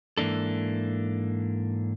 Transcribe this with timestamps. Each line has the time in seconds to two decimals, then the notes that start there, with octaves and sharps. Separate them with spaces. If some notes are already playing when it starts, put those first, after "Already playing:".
0.17 G#2 E3 A#3 D4 A4